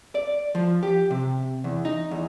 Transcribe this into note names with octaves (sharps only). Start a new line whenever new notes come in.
D5
F3
G4
C3
E2
D#4
E2